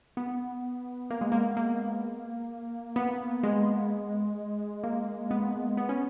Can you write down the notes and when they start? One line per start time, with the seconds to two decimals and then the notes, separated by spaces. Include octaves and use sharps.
0.17 B3
1.10 A#3
1.21 G#3
1.32 A#3
1.57 A#3
2.96 B3
3.43 G#3
4.84 A#3
5.31 B3
5.77 B3
5.89 C#4